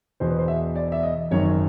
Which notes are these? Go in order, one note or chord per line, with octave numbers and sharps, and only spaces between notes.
E1 E2 B2 C5
B4
C5
E5
D5
E5
D#5
G#1 F#2 D#3 C#5